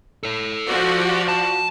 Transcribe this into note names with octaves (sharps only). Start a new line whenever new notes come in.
A4 C#5
F3 F#4 D5
G4
A5